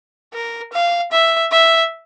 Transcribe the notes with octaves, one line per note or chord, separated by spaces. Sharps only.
A#4
F5
E5
E5